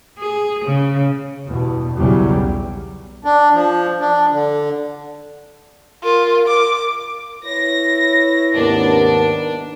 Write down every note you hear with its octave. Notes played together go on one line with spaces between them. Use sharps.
G#4
C#3
E2 G2 B2
B1 E2 C#3 F#3 G3
D4
F3
D4
D3
F4 A#4
D6
E4 B4 C#5 A#6
D#2 G#2 C3 B3 D4 A#4